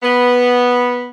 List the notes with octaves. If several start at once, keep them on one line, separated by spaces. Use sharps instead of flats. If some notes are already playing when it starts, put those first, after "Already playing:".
B3